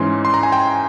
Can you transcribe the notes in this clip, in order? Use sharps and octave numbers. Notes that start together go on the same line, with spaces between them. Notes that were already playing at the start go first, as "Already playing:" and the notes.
Already playing: G#2 E3 G#3 C#4 C6
C6
A#5
G#5
G5